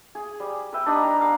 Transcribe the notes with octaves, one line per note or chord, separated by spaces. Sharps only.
G#4
G3
B4 E5 G5
D4 D#4 G4 B5
G3 A#5
F5 B5